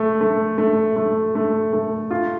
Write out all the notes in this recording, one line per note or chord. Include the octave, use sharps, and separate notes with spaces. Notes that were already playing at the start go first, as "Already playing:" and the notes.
Already playing: A3
A3
A3
A3
A3
A3
F4